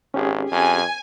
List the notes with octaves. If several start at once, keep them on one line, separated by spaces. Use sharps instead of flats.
G#1 C#4 G4 G#4
F2 G#5